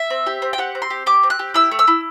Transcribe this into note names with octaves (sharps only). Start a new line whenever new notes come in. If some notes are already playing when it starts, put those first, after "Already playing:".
Already playing: E5
C4
G4
C4
G5
G4 F#5
C4
C6
G4
G4 D6
C4
F#6
G4
E4 E6
A3
E6
E4